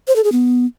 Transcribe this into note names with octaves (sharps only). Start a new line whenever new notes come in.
C5
A4
G#4
B3